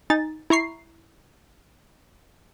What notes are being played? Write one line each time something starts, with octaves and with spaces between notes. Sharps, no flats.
D#4 G#5 A6
E4 A#5 C#6 C7